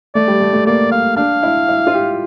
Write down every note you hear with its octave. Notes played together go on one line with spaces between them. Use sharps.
A3 D5
G3
A3
A3
A#3 D5
F5
D4 F5
E4
E4
F4
G4